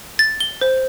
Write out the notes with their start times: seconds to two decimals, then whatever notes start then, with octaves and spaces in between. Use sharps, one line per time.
0.19 A6
0.40 G7
0.61 C5